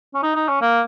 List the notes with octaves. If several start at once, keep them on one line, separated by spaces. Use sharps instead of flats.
C#4
D#4
D#4
C#4
A#3